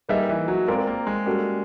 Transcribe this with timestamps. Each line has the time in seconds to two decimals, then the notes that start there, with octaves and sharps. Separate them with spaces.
0.09 G3 A#3 D#4 G#4 B4 E5
0.29 E3
0.48 F#3
0.68 G#3 C4 F4 A#4 D5
0.87 A#3
1.07 G#3
1.26 G3 A#3 C#4 F#4 A4